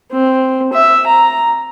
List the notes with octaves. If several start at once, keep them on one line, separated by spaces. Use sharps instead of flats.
C4
E5
A#5